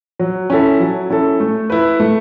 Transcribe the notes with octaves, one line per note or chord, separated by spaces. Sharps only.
F#3
C#4 E4 A4
F#3
C#4 E4 A4
A3
E4 B4
A3